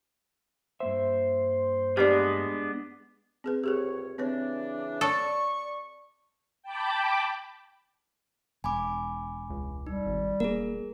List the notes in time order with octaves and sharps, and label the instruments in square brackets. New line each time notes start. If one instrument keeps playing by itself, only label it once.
[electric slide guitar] G2 A#3 E5 [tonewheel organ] C5
[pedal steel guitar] G#3 B3 D4 [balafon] G4 B4 D5
[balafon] C4 G#4 B4
[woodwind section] C#2 C3 C#5 [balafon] G4 G#4 A#4
[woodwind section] C#3 E3 D4 [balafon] C4 B4 C#5
[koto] A4 [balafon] C#5 [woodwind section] D5 C#6
[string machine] G5 A5 B5 D6
[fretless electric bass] E1 [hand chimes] G#5 B5 D6
[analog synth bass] C#2
[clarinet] G3 [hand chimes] D#4
[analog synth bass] G#1
[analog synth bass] E1 [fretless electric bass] A#3 [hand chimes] G#4 A#4